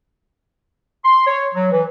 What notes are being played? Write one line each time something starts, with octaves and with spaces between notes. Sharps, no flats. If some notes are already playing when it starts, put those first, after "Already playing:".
C6
C#5
F#3
E3